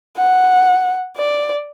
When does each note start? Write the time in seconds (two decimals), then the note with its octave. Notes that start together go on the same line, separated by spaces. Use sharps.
0.17 F#5
1.17 D5